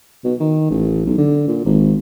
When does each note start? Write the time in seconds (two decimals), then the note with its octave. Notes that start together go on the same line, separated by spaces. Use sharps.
0.24 B2
0.40 D#3
0.71 A1
1.06 B1
1.18 D3
1.48 A#2
1.65 G#1